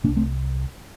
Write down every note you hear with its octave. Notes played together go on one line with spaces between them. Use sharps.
A#2 A#3 D4
C2
A3 C4